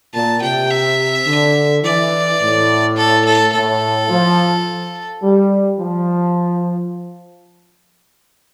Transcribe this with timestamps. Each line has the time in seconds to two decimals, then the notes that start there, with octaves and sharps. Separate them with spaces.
0.14 A#2 A5
0.42 C3 G5
0.70 E5
1.27 D3
1.83 E3 D5
2.40 A2
2.97 A4
3.25 A4
3.53 A2 A4
4.10 F3
5.23 G3
5.79 F3